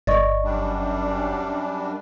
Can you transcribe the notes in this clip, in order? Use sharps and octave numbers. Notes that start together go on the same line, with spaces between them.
G1 D5 D#5 C#6
F#2 G3 D4